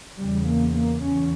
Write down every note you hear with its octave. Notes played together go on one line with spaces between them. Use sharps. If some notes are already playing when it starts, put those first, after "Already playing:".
E2 C#3 G3
A#3
A#3
E2 C#4